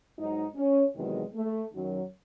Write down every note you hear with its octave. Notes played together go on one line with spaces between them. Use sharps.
G#2 F#3 D#4
C#4
E2 C3 D#3 F#3 G#3
A3
F#2 D#3 F#3